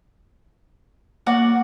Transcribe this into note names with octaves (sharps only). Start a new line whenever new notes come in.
A#3 F#4 D5 F#5